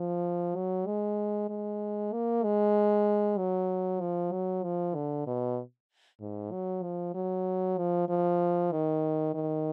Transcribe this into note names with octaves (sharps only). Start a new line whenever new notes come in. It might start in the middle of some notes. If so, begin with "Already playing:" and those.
Already playing: F3
F#3
G#3
G#3
A#3
G#3
F#3
F3
F#3
F3
D3
B2
G#2
F#3
F3
F#3
F3
F3
D#3
D#3